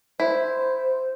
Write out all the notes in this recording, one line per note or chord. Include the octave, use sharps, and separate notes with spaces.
E4 C5